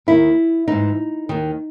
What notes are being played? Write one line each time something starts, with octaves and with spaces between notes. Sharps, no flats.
D#2 D#3 E4
G#2 E3 D#4
D#2 D#3